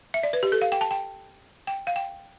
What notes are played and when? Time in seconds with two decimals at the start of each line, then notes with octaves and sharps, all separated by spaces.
0.14 E5
0.23 D5
0.33 B4
0.43 G4
0.52 A4
0.62 F5
0.72 G5
0.81 A5
0.91 G5
1.67 G5
1.87 F5
1.96 G5